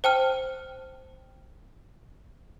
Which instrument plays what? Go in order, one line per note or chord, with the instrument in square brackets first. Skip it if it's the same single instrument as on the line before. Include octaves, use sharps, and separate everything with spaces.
[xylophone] C5 G5 A5 F6